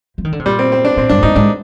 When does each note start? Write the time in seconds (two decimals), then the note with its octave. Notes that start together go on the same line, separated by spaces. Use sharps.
0.18 F3
0.25 D#3
0.32 D3
0.39 C3
0.46 A#2 G3
0.59 C4
0.72 C4
0.85 D4
0.97 A#2 C4
1.09 G2 D4
1.23 G#2 D#4
1.35 G#2 D4